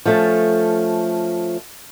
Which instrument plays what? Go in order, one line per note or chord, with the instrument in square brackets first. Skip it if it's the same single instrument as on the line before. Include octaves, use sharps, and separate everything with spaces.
[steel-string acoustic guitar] F3 A3 C#4